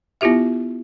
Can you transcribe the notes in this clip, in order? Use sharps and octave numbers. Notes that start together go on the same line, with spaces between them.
B3 E4 F4 G4 E5